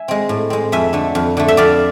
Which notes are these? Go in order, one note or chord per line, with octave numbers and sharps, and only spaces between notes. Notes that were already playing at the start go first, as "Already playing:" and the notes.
Already playing: E5 G#5
G#3 C4
A2
G#3 C4
F2 E5 G#5
D3 A3
F2
D3 A3
E5
F2 D5 F5